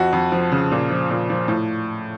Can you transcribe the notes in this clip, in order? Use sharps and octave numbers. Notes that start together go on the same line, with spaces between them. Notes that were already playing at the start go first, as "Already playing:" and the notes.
Already playing: F2 F#4
F2
F3
C#3
A#2
F3
A#2
F3
A2